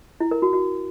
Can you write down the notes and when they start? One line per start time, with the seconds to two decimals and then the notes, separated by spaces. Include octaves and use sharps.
0.20 E4
0.31 A#4
0.42 F#4
0.53 F#4